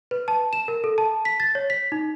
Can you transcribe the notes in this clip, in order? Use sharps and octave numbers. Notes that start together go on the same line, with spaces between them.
B4
A5
E7
A#4
A4
A5
B6
A6
C#5
B6
D#4